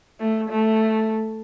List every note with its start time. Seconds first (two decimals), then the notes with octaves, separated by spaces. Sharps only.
0.20 A3
0.50 A3